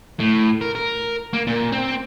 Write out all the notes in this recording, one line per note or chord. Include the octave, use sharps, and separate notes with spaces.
A2
A#4
A#4
A#3
A#2
C4